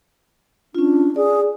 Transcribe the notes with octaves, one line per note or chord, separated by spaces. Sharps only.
C#4 D4 F4
G#4 D5